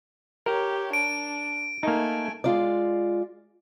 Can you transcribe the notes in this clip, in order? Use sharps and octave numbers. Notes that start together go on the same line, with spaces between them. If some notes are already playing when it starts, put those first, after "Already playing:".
G4 A#4 C#5
D4 D7
A3 A#3 D#4 G#5
G#3 F4 D5